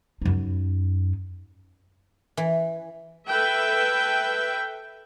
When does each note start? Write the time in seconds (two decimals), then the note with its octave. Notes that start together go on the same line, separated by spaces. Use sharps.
0.22 F#2 D#4
2.37 E3
3.28 A4 B4 E5 G5